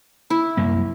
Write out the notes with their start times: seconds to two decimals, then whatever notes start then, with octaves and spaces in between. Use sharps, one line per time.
0.30 E4
0.57 C2 F#2 A#3